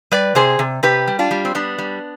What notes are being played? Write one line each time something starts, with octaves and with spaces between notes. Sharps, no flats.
G3 B4 D5
C3 G#4 C5
C3
C3 G4 B4
G3
D4 F4
G3
C4
G3 B3 D4
G3